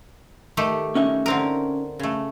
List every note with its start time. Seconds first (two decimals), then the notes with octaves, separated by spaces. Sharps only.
0.57 D#3 A3 G4
0.95 C#4 D#4 E5
1.26 D3 C4 A#4
1.99 C#3 A3